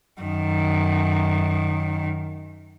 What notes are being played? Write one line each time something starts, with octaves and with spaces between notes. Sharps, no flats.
F#2 D#3